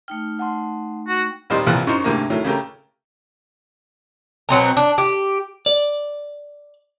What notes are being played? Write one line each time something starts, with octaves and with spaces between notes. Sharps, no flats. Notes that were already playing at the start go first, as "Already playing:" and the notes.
A3 D#4 G5 F6
F#5 A5 C6
F#4
D#2 A#2 G3 C5 D#5 C6
C2 A#2 E3 F3 F#6
F#2 D#4 C5 C#6
D2 G#2 C3 A#3 A#5
A2 D#3 F#3
C#3 A3 G4 A#4
B2 F#3 C4 A#5
D4
G4
D5